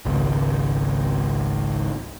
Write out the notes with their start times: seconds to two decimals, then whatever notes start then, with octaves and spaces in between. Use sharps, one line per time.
0.05 G#1 C#2